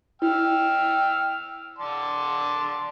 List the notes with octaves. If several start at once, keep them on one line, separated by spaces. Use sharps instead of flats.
E4 G5 E6 F6
D5 A5 C6